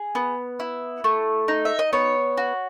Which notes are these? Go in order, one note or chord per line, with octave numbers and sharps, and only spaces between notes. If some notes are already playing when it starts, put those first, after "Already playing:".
Already playing: G#4
B3
E4
A3
D#4
E5
D#5
B3 C#5
F#4